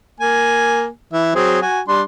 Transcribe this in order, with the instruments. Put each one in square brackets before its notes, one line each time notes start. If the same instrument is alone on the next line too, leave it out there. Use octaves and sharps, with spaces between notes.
[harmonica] A#3 G#5
E3 E5
F#3 C4 G#4
F#4 G#5
G3 D4 C6